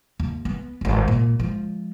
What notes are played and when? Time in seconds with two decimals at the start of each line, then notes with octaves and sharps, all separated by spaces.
0.20 D#2
0.45 B3
0.81 D#1 G#1
1.08 A#2
1.40 F3 G#3